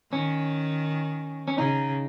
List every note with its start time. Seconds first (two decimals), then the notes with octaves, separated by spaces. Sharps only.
0.12 D#3 C#4
1.48 C#4
1.58 C#3 D#4